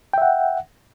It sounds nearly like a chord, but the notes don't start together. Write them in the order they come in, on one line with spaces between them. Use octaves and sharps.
G5 E5 F#5